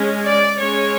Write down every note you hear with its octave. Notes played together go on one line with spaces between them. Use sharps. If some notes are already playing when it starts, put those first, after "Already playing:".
Already playing: G#3 C#4
D5
G#3 C#4 C#5